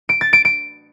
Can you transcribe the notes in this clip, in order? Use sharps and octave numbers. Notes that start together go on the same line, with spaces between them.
D7
A6
D7
D7